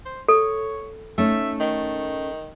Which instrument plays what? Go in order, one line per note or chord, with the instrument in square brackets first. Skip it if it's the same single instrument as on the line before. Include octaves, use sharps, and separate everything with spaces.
[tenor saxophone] C5
[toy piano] A4 [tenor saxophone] C#5
[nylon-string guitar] A3 C#4 D#4 [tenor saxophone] E5
[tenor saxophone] D#3